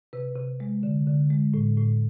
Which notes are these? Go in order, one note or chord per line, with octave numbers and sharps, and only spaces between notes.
C3 B4
C3
G#3
D3
D3
G#3
A2
A2